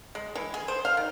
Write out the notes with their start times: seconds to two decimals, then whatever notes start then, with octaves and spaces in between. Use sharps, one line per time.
0.15 G#3
0.35 E3
0.54 G#4
0.68 C5
0.85 F5
0.97 D#3